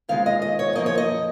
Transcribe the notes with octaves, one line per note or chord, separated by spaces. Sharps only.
D#2 D#3 G#3 C#4 F4 F5
D#5
D#5
C#5
F#2 F3 A#3 D#5
C#5
D#5